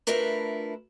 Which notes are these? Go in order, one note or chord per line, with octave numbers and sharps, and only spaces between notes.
A3 D4 E4 F4 A#4 B4